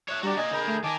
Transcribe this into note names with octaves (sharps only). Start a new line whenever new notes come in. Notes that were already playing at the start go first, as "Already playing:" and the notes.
C#5 E5 F#6
G3 D4 F#4 G4 D5 A#5
A#3 D#5 G#5
D3 G#4 A#4 B5 G6
A3
D#3 A#4 G#5 A5 D6